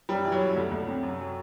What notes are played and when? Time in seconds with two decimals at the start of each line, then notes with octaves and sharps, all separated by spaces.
0.09 F#2 G3
0.25 E3
0.32 F#3
0.40 F#2
0.56 D2
0.71 D2
0.87 C3
1.03 F#2
1.19 F#3